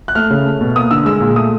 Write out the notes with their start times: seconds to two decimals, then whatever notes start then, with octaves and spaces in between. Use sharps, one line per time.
0.08 F#6
0.15 A3 F6
0.31 C#3
0.46 A3
0.61 B2
0.76 A#3 D#6
0.91 D3 E6
1.06 G#3 E6
1.21 A#2
1.36 A3 D#6